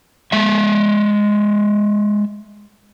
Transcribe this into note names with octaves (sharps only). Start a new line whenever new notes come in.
G#3 E5